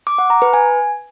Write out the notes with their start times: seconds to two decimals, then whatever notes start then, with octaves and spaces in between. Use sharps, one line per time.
0.07 D6
0.18 F#5
0.30 A#5
0.42 B4
0.53 G#5